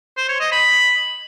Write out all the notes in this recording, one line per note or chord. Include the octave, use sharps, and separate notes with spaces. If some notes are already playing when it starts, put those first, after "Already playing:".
C5
C#5
D#5
B5